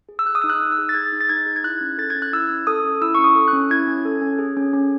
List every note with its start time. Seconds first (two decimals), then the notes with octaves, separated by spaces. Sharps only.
0.09 G#4
0.19 E6
0.26 G#4 F#6
0.35 D#6
0.42 D#4 E6
0.50 F#6
0.61 D#4
0.72 E6
0.78 G#4
0.89 A6
0.94 G#4 G#6
1.12 D#4
1.21 A6
1.29 D#4 G#6
1.46 G#4
1.56 G#6
1.64 E4 F#6
1.81 C#4
1.98 A4 A6
2.10 G#6
2.15 C#4
2.22 F#6
2.33 E4 E6
2.50 C#4
2.67 A4 D#6
2.85 C#4
3.02 E4 E6
3.15 C#4 C#6
3.24 D#6
3.35 A4
3.48 F#6
3.53 C#4
3.70 E4 G#6
3.87 C#4
4.05 A4
4.22 C#4
4.39 G#4
4.57 C#4
4.73 C#4